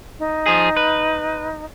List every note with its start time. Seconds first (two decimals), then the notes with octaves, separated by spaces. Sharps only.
0.19 D#4
0.46 F3 G#4
0.77 B4